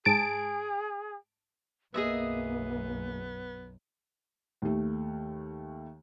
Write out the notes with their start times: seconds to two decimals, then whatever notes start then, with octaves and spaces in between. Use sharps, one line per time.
0.05 G#2 G#4 A5 D7
1.94 B1 F#2 A#3 B3 G#4 D#5 E5
4.62 D#2 A3